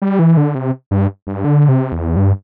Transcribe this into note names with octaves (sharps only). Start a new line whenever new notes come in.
G3
E3
D3
C3
G2
G2
D3
C3
E2
G2